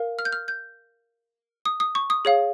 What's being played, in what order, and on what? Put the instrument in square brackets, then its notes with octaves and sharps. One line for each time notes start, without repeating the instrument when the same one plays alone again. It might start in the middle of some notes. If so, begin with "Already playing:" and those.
Already playing: [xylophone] A#4 F5
F6
G6
F6
G6
D#6
D#6
C#6
D#6
G#4 C#5 F5